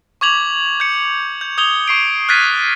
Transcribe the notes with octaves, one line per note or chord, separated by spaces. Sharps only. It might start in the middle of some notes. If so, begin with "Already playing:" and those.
C#6 D6 G#6 F7 F#7
G6 C#7
G6
D#6 G6 G#6 F7 G7
C#6 C7 D7
F6 F#6 G#6 A6 B6 D#7